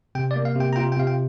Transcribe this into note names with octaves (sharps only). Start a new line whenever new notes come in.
C3 G5
D5
A#3
F5
C3 G5
A#5
F4 G5
G5
C3 F5
G5